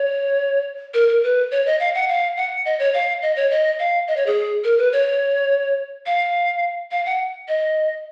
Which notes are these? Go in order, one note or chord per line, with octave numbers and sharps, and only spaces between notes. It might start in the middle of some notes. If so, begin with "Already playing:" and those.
Already playing: C#5
A#4
A#4
B4
C#5
D#5
F5
F#5
F5
F#5
D#5
C#5
F5
D#5
C#5
D#5
F5
D#5
C#5
G#4
A#4
B4
C#5
F5
F5
F#5
D#5